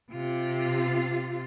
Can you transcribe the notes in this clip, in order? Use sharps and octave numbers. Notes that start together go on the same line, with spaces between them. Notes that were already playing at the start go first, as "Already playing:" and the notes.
C3 F4